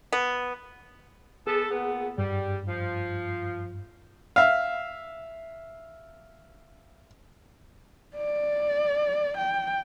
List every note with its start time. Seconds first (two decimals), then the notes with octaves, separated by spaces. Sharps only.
0.13 B3
1.47 B3 G#4 A4
1.71 A#2 B3
2.18 G2 G3
2.68 F3
4.36 E5 F5
8.16 D5
9.38 G5